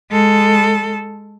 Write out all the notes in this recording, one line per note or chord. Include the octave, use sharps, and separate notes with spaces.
G#3 A4